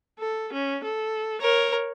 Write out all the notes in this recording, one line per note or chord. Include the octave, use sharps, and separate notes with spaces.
A4
C#4
A4
A#4 C#5